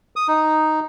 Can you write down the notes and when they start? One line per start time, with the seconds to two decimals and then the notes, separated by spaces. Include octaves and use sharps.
0.16 D#6
0.28 D#4